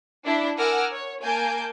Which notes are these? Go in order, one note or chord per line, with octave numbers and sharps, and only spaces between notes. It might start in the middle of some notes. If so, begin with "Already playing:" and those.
D4 E4
A#4 F#5 G#5 D6 E6 F6
C#5
A#3 G#5 A5 G6 D7